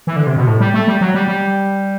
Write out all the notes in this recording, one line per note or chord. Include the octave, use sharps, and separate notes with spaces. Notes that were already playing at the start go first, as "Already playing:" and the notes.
E3
D3
C3
B2
A2
G3
A3
G3
F#3
G3
G3